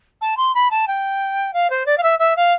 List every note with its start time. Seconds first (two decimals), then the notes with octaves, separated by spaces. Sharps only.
0.21 A5
0.37 C6
0.54 B5
0.71 A5
0.87 G5
1.53 F5
1.70 C5
1.86 D5
1.98 F5
2.03 E5
2.19 E5
2.36 F5